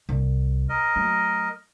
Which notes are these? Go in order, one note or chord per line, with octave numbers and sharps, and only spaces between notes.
C2
A#4 D#5
F#3 A3